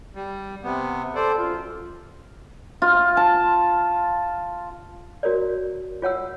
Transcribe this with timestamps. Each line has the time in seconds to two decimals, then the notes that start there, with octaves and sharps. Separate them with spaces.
0.15 G3
0.64 C3 B3
1.15 A4 C5 D5
1.38 F#2 F4
2.82 F4
3.17 A5
5.23 F#4 A#4 C#5 D5
6.02 F4 C#5 F#5 E6